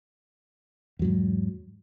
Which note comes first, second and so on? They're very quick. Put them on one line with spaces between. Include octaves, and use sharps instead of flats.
E2 F#3 G#2